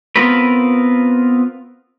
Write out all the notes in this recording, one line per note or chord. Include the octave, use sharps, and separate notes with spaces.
B3 C4 F4 A#4 B4